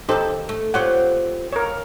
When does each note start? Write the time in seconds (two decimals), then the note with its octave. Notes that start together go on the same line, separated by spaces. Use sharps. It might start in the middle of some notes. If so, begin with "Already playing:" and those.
0.09 D#2 D#4 G4 A4 C5
0.49 A3
0.74 C4 F4 G4 C#5 F#5
1.52 A#4 C#5